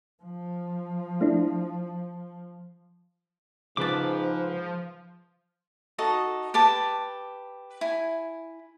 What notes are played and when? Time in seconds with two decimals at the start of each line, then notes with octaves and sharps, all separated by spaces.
0.23 F3
1.21 A3 D4 E4
3.77 G#2 C#3 F3 B4 A5 D6
5.98 D#4 F#4 A4 D#5
6.54 G4 B4 A5 D6
7.81 E4 G#5